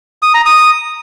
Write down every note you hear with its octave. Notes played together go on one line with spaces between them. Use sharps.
D#6
A#5
D#6